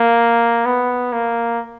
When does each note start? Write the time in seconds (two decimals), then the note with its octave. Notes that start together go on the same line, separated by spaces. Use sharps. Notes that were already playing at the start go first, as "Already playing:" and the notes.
Already playing: A#3
0.65 B3
1.13 A#3